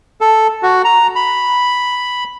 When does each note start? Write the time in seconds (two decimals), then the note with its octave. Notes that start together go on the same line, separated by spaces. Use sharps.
0.21 A4
0.63 F#4
0.85 A#5
1.16 B5